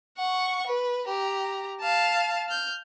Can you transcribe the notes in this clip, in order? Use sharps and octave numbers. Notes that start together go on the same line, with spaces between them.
F#5 C#6
B4
G4 A#5
F5 A5
F6 G6